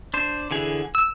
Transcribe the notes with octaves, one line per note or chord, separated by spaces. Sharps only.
D4 C5
D3 E3 G#4
E6